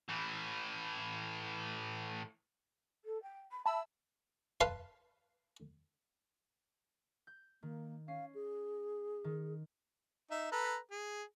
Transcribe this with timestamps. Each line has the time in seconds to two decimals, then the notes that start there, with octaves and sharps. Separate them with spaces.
0.09 A2 E3
3.04 A4
3.22 G5
3.51 B5
3.66 E5 A5 B5 E6
4.61 B4 F5 A5 C6
7.27 G6
7.63 D#3 A#3
8.08 C#4 F5 C7
8.35 G#4
9.24 D#3
10.31 D#4 E5
10.52 A4 B4 A#5
10.91 G#4